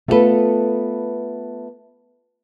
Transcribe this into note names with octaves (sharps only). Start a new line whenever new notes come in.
A3 B3 F4 F#4 A4 B4